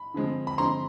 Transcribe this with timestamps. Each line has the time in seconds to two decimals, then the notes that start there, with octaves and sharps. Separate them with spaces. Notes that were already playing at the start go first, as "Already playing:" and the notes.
Already playing: B5
0.14 D3 F3 G#3 C4
0.47 B5
0.58 D3 F3 G#3 C4 A#5 C6